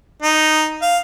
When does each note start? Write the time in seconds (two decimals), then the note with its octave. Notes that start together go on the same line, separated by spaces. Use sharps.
0.23 D#4
0.82 F5